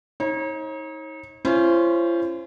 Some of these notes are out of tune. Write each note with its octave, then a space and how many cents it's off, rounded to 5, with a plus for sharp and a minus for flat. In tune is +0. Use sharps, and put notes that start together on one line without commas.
D#4 +30 C#5 -40
C#4 +0 F4 -45 C5 +0